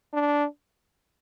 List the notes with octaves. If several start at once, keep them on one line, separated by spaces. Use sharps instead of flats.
D4